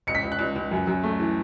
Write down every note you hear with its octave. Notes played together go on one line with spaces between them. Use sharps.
C#2 C#7
B6
C#2
F#6
C#2
C#2
F#2
F#2
A3
E3